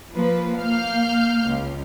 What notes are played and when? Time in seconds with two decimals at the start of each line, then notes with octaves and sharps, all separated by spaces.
0.13 F3 A#3 B4
0.59 A#3 F5 F6 G6
1.46 C#2